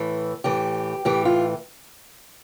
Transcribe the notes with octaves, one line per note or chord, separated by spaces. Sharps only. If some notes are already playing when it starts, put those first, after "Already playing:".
Already playing: A2 E3
A2 E3 G4
A2 E3 G4
F4